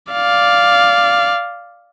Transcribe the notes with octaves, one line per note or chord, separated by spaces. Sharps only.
D5 F5